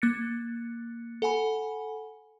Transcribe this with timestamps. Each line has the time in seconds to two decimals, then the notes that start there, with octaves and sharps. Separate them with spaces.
0.02 A#3 F#6 A6 C#7
1.22 A4 F#5 G#5 B5